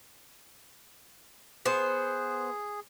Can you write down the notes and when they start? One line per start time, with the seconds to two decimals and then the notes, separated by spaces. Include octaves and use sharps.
1.65 B3 G#4 C5